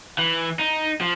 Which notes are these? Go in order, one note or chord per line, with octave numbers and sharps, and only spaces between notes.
E3
D#4
F3